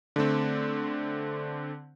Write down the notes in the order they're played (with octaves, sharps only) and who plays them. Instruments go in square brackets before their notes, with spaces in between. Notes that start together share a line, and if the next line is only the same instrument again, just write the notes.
[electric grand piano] D3 A3 C4